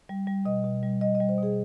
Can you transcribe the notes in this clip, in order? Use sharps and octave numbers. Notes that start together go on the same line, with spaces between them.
G3
G3
B2 D#5
B2
G3
G3 D#5
D#5
G3
C5
B2 G#4